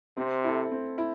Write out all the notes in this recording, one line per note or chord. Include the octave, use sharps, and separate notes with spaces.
C3 C4
E4 A4
C4
E4